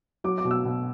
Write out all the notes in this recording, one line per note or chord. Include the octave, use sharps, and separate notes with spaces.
F#3 D6
D6
B2
E6
B2